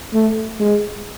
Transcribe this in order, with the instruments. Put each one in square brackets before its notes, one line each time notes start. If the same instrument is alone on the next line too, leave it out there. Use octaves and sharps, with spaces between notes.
[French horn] A3
G#3